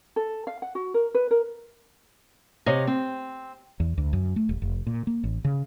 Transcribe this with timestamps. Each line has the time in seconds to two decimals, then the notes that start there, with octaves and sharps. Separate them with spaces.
0.16 A4
0.47 F5
0.62 F#5
0.75 F#4
0.94 A#4
1.14 B4
1.31 A#4
2.66 C3 C#5 D#5 F5
2.87 C4
3.80 E2
3.98 D2
4.13 F#2
4.36 A3
4.49 D#1
4.62 F1
4.87 A#2
5.07 A#3
5.24 A1
5.45 C#3